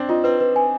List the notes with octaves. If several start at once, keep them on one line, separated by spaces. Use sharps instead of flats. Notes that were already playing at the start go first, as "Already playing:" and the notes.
Already playing: C4 D4
D#4 F4
C4 B4
B4
G#5